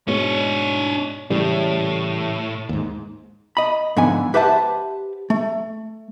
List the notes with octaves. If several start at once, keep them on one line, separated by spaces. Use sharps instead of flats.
G#2 B2 G#3 D4 C#5
A2 C#3 E3 G3
D#2 G#2
D#5 B5
G#2 D3 F3 B3 G#5
G4 B4 C5 E5 F#5 A5
A3